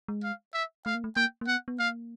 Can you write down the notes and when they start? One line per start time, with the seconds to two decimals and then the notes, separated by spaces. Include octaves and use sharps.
0.08 G#3
0.24 F5
0.54 E5
0.86 A3 F5
0.95 A#3
1.04 A3
1.16 A#3 G5
1.41 A#3
1.47 B3 F#5
1.68 B3
1.79 A#3 F5